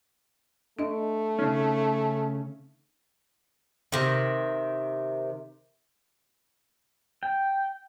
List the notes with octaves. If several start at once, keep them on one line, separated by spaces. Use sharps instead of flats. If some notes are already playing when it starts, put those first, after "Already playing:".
A3 D4 D#5
C#3 C#4 D#4
C3 D#3
G5